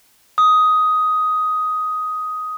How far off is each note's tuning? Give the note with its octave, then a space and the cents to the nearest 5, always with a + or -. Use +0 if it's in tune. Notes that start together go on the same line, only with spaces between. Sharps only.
D#6 +10